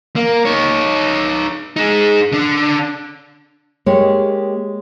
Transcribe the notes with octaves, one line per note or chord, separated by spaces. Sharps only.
A#3
D#4 C#5
D#4 G#4
D3 D4
G#3 A#3 G4 C#5